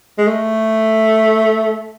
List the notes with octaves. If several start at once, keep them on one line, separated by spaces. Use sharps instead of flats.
G#3
A3